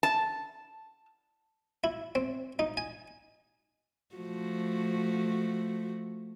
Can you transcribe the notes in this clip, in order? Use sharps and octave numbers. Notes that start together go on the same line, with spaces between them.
A5
E4
C4
D#4
G#5
F3 A3 F#4